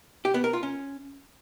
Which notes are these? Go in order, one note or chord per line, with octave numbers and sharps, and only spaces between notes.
G4
B3
A#4
F4
C#4